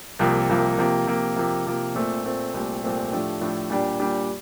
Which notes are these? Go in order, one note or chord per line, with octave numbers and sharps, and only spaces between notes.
C2 C3 F3 A#3
C2 C3 F3 A#3
C3 F3 A#3
C3 F3 A#3
C3 F3 A#3
C3 F3 A#3
A#2 A3 C4
A#2 A3 C4
C2 A#2 A3 C4 G4
C2 A#2 A3 C4 G4
A2 F3 A3 D4 G4
A2 F3 A3 D4 G4
A#2 G3 D4 G4
A#2 G3 D4 G4